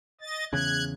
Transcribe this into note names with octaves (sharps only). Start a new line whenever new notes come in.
D#5 A6
E2 C#3 F#6 G#6